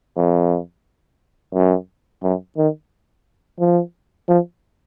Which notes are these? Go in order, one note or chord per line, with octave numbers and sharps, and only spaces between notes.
F2
F#2
F#2
D#3
F3
F3